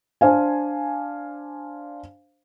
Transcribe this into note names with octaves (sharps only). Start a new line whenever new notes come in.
D4 C5 F5 G#5